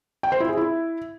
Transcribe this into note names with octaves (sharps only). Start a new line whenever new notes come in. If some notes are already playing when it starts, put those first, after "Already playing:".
G5
C5
E4
G#4
E4